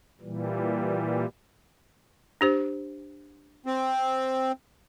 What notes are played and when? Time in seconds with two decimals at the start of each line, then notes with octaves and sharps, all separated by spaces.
0.21 A#2 E3 G3
2.41 D4 G4 C5
3.66 C4